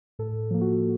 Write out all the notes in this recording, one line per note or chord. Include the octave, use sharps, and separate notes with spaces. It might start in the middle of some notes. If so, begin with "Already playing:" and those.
A2 A4
F3 A#3
F#4